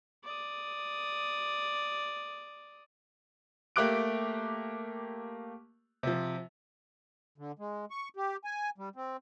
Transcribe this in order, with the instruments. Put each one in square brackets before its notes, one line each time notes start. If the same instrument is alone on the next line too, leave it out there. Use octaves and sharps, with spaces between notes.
[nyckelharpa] D5 D#6
[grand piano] A3 A#3 G4 D6 F#6 D7
C3 F3
[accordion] D3
G#3
C#6
G4
G#5
G3
C4